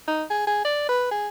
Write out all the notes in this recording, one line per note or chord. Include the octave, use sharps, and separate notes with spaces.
D#4
G#4
G#4
D5
B4
G#4